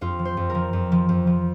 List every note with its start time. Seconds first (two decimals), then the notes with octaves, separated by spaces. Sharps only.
0.01 F2 F4
0.19 F3
0.25 C5
0.37 F2
0.49 A#4
0.55 F3
0.73 F2
0.92 F3
1.09 F2
1.27 F3